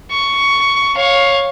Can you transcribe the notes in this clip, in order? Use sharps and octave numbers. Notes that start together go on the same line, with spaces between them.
C#6
C#5 F5